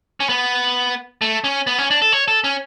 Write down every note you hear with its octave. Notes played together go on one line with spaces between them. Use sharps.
C#4
B3
A3
C#4
B3
C#4
D4
A4
C#5
A4
C#4